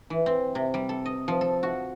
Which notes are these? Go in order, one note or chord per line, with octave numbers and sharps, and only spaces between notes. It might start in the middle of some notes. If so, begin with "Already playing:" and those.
E3
C4
C3
G3
A4
D#5
F3
A4
F#4